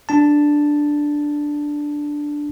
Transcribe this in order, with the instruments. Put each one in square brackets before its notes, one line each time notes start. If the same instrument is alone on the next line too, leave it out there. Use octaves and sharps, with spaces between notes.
[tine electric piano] D4 A5